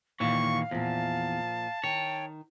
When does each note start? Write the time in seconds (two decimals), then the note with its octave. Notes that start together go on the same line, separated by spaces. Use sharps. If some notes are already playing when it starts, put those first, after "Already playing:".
0.20 D#2 A#2 E3 F5 C#6
0.71 E2 A#2 F3 A5
1.84 D#3 C#5 G5